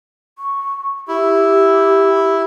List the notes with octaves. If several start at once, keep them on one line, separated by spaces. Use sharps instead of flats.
C#6
E4 G4